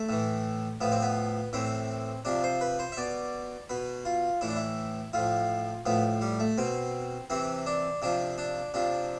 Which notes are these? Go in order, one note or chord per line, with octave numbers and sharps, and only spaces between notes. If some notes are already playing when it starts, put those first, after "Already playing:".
Already playing: A3
A2 E3
A2 F3 B3
C4
B3
A2 E3 C4
C3 F3 D4
C5
B4
C5
E5
B2 D5
B2 B4
F4
A2 E3 E4
D4
E4
A2 F3 F4
A2 F3 B3
G3
A3
B2 C4
C3 E3 C4
D4
C3 F3 D4
D4
C3 F3 D4